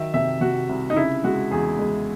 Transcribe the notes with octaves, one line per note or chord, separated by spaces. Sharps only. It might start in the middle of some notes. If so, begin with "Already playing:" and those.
Already playing: D#3 F#3 E5
C3 E5
C3 F#4
C2
D#4
C#3 E4
G#3 F#4
E2 G#4
G#3